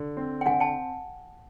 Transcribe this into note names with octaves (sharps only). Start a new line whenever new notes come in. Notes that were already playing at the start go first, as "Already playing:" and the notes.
Already playing: D3
C4
G5
D3 F#5 G#5
G5 A5